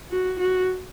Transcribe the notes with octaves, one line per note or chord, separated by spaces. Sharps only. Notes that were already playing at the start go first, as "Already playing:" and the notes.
F#4
F#4